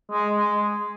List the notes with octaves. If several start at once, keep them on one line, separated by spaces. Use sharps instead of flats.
G#3
G#3